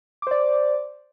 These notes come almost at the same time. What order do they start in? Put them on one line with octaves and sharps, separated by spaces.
D6 C5 D5